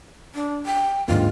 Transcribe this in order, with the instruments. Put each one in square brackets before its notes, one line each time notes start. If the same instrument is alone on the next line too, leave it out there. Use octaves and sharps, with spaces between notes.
[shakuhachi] D4
G5
[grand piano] D#2 G#2 D3 [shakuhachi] F4